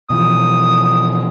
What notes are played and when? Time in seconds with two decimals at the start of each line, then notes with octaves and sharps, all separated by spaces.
0.10 B2 E3 F3 D#6